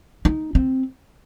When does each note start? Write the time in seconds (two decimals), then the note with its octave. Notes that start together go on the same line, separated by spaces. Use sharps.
0.25 D#4
0.55 C4